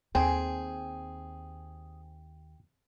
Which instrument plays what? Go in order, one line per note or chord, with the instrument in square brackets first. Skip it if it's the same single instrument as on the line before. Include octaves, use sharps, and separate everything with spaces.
[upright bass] D#2 [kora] C4 [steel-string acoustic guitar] G#4 [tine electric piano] G5